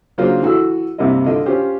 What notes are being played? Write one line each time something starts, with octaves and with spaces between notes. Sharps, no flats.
C#3 F#3 A#3 D4 F4 C5
E3 F#4 A4 E6
C2 G2 C3 A#3 E4 D#5
D3 F4 D#5
C#4 F4 G4 C5